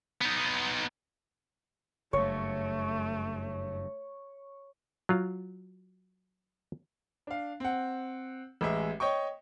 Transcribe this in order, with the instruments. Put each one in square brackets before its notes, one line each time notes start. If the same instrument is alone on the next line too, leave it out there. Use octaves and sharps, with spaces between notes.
[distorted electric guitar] B3 D#4
[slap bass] F#1 G2 [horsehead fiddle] A3 [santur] C#5
[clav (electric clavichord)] F#3 F4
[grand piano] D4 F5
C4 F#5
A1 G#3 E5
C#5 D#5 G5 C#6